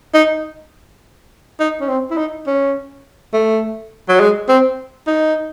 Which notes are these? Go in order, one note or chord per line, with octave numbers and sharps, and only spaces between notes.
D#4
D#4
C#4
C4
E4
D#4
C#4
A3
F#3
G#3
C4
D#4